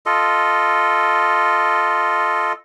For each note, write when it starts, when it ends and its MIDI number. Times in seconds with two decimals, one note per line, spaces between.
0.06 2.53 65
0.06 2.53 69
0.06 2.53 75